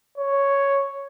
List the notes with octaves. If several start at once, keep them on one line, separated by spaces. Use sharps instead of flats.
C#5